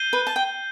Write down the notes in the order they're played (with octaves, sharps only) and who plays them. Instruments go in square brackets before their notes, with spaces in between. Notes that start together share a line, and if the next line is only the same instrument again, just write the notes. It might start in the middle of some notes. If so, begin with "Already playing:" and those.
Already playing: [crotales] G6 C7 D#7 G7
[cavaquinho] B4
A5
G5